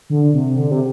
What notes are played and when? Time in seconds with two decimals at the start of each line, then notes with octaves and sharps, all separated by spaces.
0.10 D3
0.34 C3
0.56 D3
0.71 C3